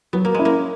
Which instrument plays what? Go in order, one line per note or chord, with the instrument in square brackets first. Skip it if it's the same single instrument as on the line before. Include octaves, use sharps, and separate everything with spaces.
[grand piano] F#3 [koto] B3
[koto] A#3
[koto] G#3 [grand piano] C#4 E4
[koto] A#3